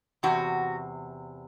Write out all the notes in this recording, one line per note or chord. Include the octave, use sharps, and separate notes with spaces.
E2 C3 F#4